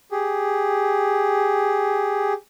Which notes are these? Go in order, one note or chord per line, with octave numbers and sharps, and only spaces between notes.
G4 G#4